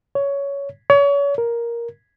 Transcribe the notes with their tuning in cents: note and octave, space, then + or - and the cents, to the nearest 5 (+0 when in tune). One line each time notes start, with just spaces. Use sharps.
C#5 +15
C#5 +35
A#4 +10